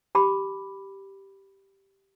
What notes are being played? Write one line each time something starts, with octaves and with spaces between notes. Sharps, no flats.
G4 A5 B5 D6